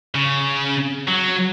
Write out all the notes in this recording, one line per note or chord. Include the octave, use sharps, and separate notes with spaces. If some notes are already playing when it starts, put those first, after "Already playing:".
C#3
F#3